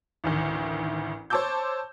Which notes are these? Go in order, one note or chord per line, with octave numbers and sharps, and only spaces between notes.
A1 D2 D#3
C5 C#5 A5 D6 E6 G6